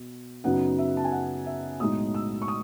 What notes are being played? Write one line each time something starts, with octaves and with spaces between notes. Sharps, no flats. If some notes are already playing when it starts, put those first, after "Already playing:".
Already playing: B2
F#2 C#3 F#3 B3 D#4 F#5
E5
A5
G#5
F#5
E5
B1 A2 G#3 D#4 D#6
E6
C#6
D#6